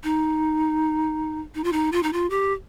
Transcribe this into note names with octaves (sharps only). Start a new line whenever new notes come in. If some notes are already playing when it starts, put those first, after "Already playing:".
D#4
D#4
F4
D#4
F4
D#4
F4
G4